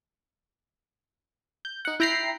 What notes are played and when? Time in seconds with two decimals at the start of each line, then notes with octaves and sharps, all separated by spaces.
1.65 G6
1.85 D#4 F#5
2.00 E4 G5 A#5 B5 C7